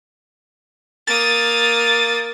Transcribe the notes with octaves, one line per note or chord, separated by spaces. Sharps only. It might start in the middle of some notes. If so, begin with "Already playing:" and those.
A#3 D#6 A6